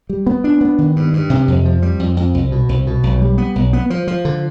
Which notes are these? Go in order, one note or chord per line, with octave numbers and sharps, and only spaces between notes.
G3
B3
D4
B3
D#3
G2
G2
C3
F2
F3
G3
F2
F2
C2
B2
C2
B2
B1
G3
B3
B1
B3
F3
F3
D3